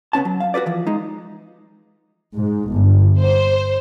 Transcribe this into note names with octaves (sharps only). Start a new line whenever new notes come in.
C#3 B3 C#4 A5
F#3
F5
F#4 A4 B4 D5
E3 F3
G#3 D#4
G#2
G1
C5